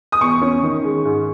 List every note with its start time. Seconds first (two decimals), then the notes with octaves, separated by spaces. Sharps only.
0.12 D#6
0.21 E2 C#6
0.41 C#4
0.63 D#3
0.84 G#3
1.05 G#2